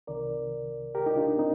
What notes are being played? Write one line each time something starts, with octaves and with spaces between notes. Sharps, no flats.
C2 C3 D#3 A#4 D5
G4 A#4
D#4 G4
D4 F4
C4 D#4